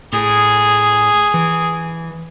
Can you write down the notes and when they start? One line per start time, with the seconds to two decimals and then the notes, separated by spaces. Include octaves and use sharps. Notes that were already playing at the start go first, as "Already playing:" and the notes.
0.13 A2 G#4
1.34 E3